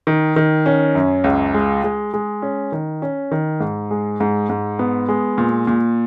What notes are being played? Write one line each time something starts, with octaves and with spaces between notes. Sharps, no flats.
D#3
D#3
C#4
F#2
C#2
G#3
G#3
G#3
C#4
D#3
C#4
D#3
G#2
G#3
G#2
G#2
B3
G#3
A#2
A#2